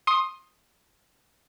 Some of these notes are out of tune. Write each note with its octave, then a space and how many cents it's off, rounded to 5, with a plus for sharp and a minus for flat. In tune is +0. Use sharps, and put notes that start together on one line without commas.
C6 +20 D#6 +0